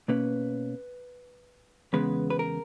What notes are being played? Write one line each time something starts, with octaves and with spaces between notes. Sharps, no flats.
B2 A#3 C#4 B4
E2 C#3 G#3 B3 B4
B4
A#4